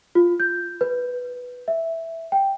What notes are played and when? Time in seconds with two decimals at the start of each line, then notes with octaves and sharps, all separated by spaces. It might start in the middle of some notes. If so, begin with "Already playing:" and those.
0.15 F4
0.40 G6
0.81 B4
1.68 E5
2.32 G5